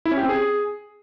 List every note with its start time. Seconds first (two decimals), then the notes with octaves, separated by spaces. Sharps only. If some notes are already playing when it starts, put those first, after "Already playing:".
0.05 E4
0.11 C#4
0.17 G4
0.23 C4
0.29 G#4